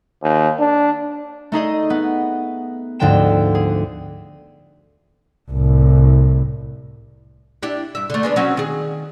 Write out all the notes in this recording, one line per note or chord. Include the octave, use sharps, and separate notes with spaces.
D#2
D4
A3 D#4 G#4 D#5
B3
D2 G#2 D3 F3 G5 E7
G#4
C2 A2
D4 E4 G4
G2 E5
D3 A3
G#3 B3 D4
F#3 C4 C#4
D#3 G#4